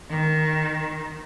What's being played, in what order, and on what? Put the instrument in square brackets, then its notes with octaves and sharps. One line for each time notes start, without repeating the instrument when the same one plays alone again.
[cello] D#3